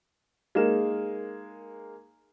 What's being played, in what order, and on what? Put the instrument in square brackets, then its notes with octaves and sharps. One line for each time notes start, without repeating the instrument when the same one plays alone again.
[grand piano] G#3 A#3 D#4 A#4 E7